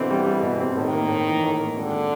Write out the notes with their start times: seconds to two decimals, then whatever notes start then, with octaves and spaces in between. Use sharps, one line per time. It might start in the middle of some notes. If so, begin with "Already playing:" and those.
Already playing: B2 D3 E3 C4
0.10 G3
0.26 G3
0.43 B2
0.60 C4
0.77 A2 D#3
0.93 A#3
1.09 A2
1.27 E3
1.44 A2
1.60 A#3
1.76 G#1 D3